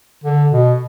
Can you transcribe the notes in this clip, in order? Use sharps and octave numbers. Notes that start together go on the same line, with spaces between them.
D3
B2